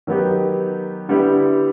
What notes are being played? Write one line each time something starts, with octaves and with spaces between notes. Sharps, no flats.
D#3 F#3 B3 D#4 G4
D3 G3 B3 E4 G4